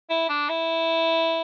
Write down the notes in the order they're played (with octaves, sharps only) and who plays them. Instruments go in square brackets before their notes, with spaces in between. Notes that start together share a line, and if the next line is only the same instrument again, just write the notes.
[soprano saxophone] E4
D4
E4